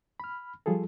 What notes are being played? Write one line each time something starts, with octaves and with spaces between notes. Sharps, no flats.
B5 F6
F3 G3 F4 G#4 A4